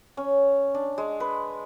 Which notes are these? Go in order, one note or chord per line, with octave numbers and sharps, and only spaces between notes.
C#4
D4
G#3
B4